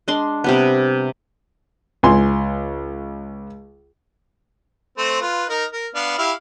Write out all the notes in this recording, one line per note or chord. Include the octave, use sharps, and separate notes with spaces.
G#3 D4 C6
C3 G3 B3
C#2 G#5 C6
A3 C4 C5
F4 B4
D#4 A#4
A#4
B3 D4 F5
E4 G4 F5